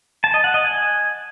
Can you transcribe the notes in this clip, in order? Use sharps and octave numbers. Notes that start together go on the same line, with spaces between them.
A5
D#5
F#5
D#5
G#5